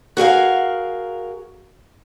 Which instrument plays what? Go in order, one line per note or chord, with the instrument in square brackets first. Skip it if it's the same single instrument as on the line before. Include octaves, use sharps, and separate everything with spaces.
[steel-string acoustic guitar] F#4 G#4 A#4 F5